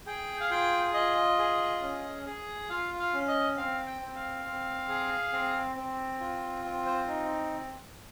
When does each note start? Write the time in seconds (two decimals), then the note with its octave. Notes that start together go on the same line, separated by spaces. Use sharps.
0.06 G#4 G5
0.40 F5
0.50 F4 G5
0.94 F4 D#5
1.38 G#4
1.81 C#4
2.26 G#4
2.70 F4 F5
2.99 F5
3.13 C#4
3.28 D#5
3.57 C4 F5
3.86 G5
4.01 C4
4.16 F5
4.45 C4
4.89 G#4
5.32 C4
5.76 C4
6.20 F4
6.64 C4
6.86 C5
7.08 D#4